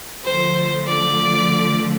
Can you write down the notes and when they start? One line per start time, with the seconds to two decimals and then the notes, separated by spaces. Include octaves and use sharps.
0.24 D3 F3 A3 C5
0.87 D5